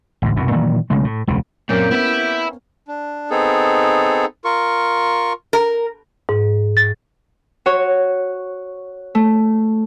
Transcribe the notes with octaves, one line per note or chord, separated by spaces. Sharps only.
A1 D2 G#2
C2 F#2 B2
A#2 D#3 E3 F#3
B1 C#3 G#3 A3
A2
E1 C#2 C#3
F#2 A#2 A#3 C4 C#4 G4
B3 E4 E5
D4
B3 C4 D#4 G#4 A4
F4 A#4 C#6
A#4
G#2
A6
F#4 C#5
A3